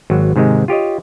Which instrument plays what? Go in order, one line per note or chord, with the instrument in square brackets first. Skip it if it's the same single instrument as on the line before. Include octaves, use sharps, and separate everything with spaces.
[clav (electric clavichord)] G#1 F#3
G#2 C3 D#3 G#3
F4 G4 C#5 D#5